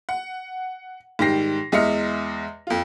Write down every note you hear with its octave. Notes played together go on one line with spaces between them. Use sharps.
F#5
G#2 D#3 G3 G5 A#6 C7
E2 G#3 D#5 E5 F6 C#7
F2 F4